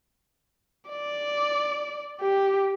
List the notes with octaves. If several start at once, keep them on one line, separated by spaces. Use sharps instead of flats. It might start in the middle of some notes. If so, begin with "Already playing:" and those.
D5
G4